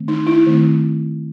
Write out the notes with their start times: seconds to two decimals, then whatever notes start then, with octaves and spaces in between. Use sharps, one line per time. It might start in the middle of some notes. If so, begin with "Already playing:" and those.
Already playing: D#3 A3 C4
0.08 D#4
0.27 E4
0.46 D#3 A3 C4